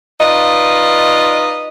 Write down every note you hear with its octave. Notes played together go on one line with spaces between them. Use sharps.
D#4 F4 B4 D5 D#5